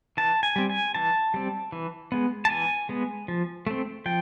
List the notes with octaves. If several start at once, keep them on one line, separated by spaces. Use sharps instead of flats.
E3 A5
G#5
G3 C4
G#5
E3 A5
G3 C4
E3
G#3 B3
A5
E3 G#5
G#3 B3
F3
A3 C4
F3 G5